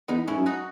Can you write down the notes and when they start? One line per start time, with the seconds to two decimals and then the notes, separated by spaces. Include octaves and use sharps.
0.08 E2 B3 D#4
0.28 G#2 C#4 E4
0.37 F#2
0.46 D#4 F#4